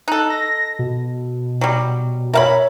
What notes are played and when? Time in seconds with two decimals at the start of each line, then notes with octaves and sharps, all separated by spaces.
0.08 D#4 A4 F#6
0.30 A#6
0.79 B2
1.61 F#3 G3
2.34 A#4 C#5 E5 F5 B5